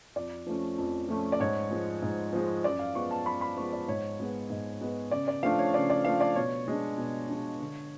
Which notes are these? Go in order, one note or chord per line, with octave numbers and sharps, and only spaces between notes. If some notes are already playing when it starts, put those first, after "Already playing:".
F2 D5
F3 A3 C#4
F2
F3 A3 C#4
D5
G#2 C#5
F3 G#3
G#2
F3 G#3
F#2 D5
F5
F3 G#3 B3 C#6
A5
F#2 B5
B5
F3 G#3 B3 C#6
D5
G#2 C#5
G#3 B3
G#2
G#3 B3
C#3 D5
D5
F3 A3 D4 F5
C#5
C#3 D5
D5
F3 A3 D4 F5
D5
B2 C#5
G#3 D4
B2
G#3 D4
D3